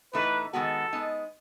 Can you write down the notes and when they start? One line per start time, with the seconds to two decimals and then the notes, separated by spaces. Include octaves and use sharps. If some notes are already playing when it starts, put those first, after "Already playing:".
0.13 A2 E3 A3 D#4 B4
0.53 D#3 G#3 B3 F#4 A4
0.93 G#3 B3 D#4